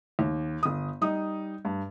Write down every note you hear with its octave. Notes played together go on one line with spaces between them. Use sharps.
D#2
G1 D#6
G3 D#4 D#6
G2